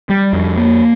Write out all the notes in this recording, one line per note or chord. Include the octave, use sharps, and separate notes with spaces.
G3
F2
A#3